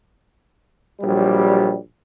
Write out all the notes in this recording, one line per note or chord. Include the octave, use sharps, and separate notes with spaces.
A#1 F#3 G3